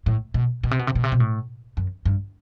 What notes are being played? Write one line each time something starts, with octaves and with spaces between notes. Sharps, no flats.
A2
B2
B2
C3
B2
C3
B2
C3
B2
A2
F#2
G2